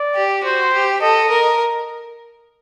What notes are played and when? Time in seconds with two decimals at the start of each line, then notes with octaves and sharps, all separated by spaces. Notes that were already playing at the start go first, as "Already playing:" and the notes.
Already playing: D5
0.16 G4
0.44 F#4 C5
0.73 G4
1.02 A4 D#5
1.30 A#4